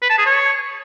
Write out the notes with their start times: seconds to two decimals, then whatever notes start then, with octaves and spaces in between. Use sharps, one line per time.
0.02 B4
0.10 A5
0.18 G#4
0.26 C#5